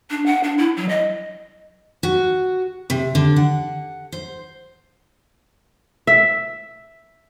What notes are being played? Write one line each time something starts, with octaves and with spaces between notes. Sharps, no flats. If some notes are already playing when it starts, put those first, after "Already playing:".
D4
F#5
D4
E4
F#3
D#5
F#4
C3
D3
F#5
C5
E5